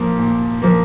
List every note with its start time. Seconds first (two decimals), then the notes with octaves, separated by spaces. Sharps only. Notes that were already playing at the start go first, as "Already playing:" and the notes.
Already playing: A#2 F3 A#3
0.19 A#2
0.62 F3 A#3